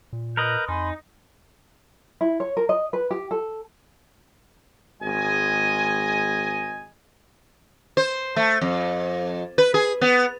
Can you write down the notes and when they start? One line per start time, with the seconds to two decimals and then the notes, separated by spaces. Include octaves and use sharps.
0.13 A#2
0.37 A#4 B4 D#5 G6
0.68 F2 D#4 G#5 B5 C6
2.21 E4
2.40 C#5
2.57 A#4
2.69 D#5
2.93 B4
3.11 G4
3.31 A4
5.02 G#1 G#3 D#5 G#5
7.97 C5
8.36 A3
8.61 F2
9.58 B4
9.74 G#4
10.01 B3